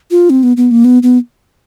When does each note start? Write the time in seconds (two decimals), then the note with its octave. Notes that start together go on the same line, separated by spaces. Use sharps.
0.11 F4
0.30 C4
0.43 B3
0.57 B3
0.71 A#3
0.85 B3
1.03 B3